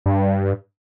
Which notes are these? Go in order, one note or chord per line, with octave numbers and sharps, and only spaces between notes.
G2